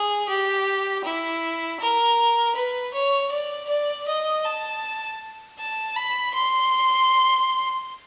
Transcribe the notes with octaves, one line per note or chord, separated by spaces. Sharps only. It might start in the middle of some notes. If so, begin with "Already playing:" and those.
Already playing: G#4
G4
E4
A#4
B4
C#5
D5
D5
D#5
A5
A5
B5
C6